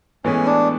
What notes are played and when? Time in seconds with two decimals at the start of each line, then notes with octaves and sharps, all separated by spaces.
0.24 A2 E3 G#3 B3 C#4
0.46 D4